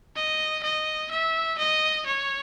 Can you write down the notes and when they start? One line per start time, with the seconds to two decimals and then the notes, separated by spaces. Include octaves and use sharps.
0.16 D#5
0.63 D#5
1.11 E5
1.58 D#5
2.06 C#5